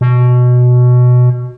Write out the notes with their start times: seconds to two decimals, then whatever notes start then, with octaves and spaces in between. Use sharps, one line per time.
0.01 B2